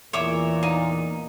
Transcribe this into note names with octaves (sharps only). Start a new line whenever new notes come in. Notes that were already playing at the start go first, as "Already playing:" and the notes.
E2 A#2 C#5 E5 D6
D#4